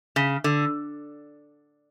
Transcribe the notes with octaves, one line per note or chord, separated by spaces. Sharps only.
C#3
D3